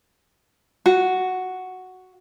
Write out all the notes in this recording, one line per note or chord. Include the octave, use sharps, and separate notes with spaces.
F#4